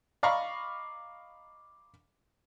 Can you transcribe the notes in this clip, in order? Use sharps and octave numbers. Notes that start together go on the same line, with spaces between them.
D5 D#5 F5 A#5 B5 C#6